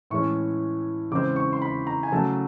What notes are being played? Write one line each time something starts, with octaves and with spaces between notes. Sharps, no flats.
A2 E3 G#3 C#4 C#6
C#3 E3 G#3 C4 D6
C#6
C6
B5
A#5
G#5
C#3 F#3 A3 A5